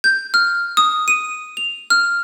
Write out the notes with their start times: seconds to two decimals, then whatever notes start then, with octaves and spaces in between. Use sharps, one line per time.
0.04 G6
0.34 F6
0.77 D#6
1.08 D#7
1.57 F7
1.90 F6